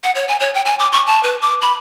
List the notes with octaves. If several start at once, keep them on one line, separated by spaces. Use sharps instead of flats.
F#5
C#5
G#5
C#5
G5
G#5
D6
C#6
A5
B4
D6
B5